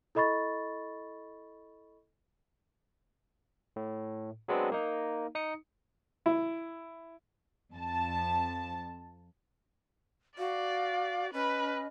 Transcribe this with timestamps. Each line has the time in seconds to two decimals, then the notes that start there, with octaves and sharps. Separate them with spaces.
0.15 E4 A4 D#5 B5 C#6 A6
3.76 A2
4.48 F#3 G#3 B3 C4 D4
4.72 A#3 D#4
5.35 D#4 D#6 C#7
6.26 E4
7.74 F2 A5
10.38 F#4 D5 F5
11.33 C#4 B4 D#5